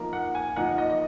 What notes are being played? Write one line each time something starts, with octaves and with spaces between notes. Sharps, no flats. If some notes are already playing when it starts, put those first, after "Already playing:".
Already playing: F3 A#3 D#4 A#4
F#5
G#5
F3 A#3 D#4 A#4 F#5
D#5
D#5